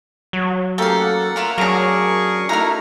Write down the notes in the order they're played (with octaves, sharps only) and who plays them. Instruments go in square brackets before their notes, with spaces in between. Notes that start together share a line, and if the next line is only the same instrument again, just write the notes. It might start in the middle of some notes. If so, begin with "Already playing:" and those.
[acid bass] F#3
[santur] A3 A#3 C#4 [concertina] G4 [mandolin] A4 C6
[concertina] F#5
[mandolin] E4 F4 A#4
[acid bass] F#3 [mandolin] D4 A#5 [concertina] G#4 A#4 C#6
[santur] A3 A#4 E5 [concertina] D#4 E4 F#4 [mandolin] A#5 F6